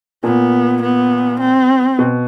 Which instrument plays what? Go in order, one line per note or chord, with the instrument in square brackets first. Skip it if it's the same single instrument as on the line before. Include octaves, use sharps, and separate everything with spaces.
[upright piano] A#2 [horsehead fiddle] B3
[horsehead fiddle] B3
C4
[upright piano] B2